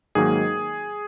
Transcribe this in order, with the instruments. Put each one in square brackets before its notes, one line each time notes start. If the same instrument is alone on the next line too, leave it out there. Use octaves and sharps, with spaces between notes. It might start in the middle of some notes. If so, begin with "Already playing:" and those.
[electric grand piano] G#2 D#3 F#3 A#3 G#4